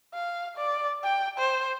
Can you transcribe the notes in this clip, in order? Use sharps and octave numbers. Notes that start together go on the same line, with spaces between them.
F5
D5
G5
C5